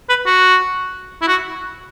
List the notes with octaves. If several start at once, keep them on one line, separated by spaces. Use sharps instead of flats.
B4
F#4
E4
F#4